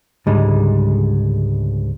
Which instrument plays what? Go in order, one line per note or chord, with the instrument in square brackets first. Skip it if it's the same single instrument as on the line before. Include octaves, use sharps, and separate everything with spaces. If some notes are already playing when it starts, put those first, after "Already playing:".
[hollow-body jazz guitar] C#2 G#2 D3 G3 G#3